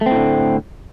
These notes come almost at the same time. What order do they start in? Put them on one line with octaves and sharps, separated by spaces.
A3 C4 A2 D3